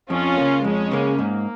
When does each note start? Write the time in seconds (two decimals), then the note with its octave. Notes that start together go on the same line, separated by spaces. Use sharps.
0.10 F2 C#4 F4
0.37 C#3 A#3
0.64 F2 G#3 C#4
0.92 C#3 A#3
1.19 G#2 A#3